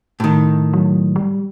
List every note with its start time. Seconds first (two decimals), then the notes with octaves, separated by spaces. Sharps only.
0.20 A2 D#3
0.73 F#3
1.16 G3